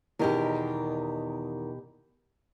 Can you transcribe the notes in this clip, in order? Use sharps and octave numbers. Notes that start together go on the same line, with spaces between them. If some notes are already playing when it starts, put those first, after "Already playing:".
E2 B2 D#3 G4 A#4